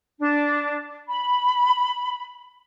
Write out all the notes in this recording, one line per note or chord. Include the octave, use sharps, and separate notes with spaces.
D4
B5